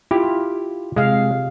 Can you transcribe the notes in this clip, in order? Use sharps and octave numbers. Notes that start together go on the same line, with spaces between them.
E4 F4 G4
C3 G#3 F5